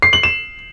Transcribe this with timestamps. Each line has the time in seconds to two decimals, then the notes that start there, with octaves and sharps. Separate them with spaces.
0.02 C7
0.13 F#7
0.23 E7